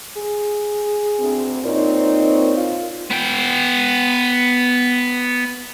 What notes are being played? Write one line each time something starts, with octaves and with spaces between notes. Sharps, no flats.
G#4
D2 C4
A#2 C4 D#4 C#5
F4
B3 G5